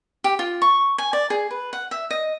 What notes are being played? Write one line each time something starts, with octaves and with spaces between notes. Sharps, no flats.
G4
F4
C#6
G#5
D5
G#4
B4
F#5
E5
D#5